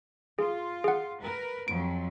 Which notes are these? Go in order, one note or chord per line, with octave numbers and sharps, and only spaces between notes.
F4 G#4
G#4 F#5
A#4 B4
F2 F3 F#3 D7